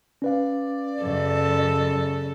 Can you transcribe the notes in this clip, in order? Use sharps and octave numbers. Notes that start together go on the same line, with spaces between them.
C#4 B4 D5 F5
F#2 C#3 A4